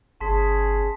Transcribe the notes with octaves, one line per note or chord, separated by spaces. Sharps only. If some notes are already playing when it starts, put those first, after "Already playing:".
G1 C#4 G#4 A5 C6 B6